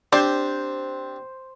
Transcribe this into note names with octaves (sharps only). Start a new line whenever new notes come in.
C4 D4 G4 C5 D5